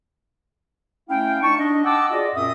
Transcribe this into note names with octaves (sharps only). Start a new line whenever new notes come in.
A3 C#4 E4 F5 G5
D4 D#4 A5 C#6
D4 D#5
D#5 F#5 G5 A5 D6 E6
F4 F#4 G#4 D5 D#5
F#2 A#2 C4 D#5 E5 D#6